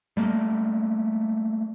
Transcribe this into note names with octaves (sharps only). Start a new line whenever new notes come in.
G3 A3 A#3